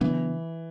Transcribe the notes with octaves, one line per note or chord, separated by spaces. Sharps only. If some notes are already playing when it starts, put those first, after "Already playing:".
C#3 E3 F#3 B3 D4